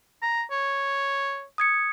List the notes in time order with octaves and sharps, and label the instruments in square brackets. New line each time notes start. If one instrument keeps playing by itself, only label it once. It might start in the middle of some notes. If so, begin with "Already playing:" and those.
[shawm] A#5
C#5
[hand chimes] D#6 G#6 C#7